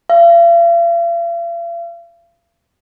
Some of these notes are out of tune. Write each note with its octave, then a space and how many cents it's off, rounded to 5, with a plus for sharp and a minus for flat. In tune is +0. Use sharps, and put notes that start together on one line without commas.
F5 -45